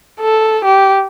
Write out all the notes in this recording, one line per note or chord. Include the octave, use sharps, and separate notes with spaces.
A4
G4